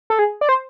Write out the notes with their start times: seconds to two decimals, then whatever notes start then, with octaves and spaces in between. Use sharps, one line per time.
0.10 A4
0.19 G#4
0.41 D5
0.49 C5